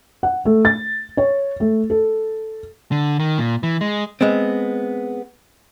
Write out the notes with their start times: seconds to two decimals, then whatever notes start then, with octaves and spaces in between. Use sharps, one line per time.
0.23 F#5
0.45 A3
0.65 A6
1.17 C#5
1.60 A3
1.90 A4
2.92 D3
3.20 D#3
3.38 A#2
3.63 E3
3.81 G#3
4.21 G#3 B3 C4